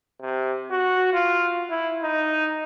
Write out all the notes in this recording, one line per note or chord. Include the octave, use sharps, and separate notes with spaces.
C3
F#4
F4
E4
D#4